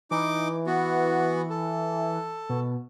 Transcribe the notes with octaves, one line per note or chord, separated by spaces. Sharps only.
E3 D#4 D6
B3 F#4
A4
B2